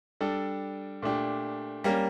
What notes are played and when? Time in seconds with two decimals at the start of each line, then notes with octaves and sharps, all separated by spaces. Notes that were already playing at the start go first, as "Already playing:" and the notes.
0.21 G3 D4 A4
1.02 A#2 A3 D4 G4
1.84 G3 A#3 C#4